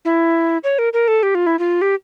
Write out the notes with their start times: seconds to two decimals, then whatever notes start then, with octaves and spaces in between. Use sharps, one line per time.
0.05 E4
0.64 C#5
0.79 A#4
0.93 A#4
1.08 A4
1.23 G4
1.35 F4
1.47 E4
1.59 F4
1.82 G4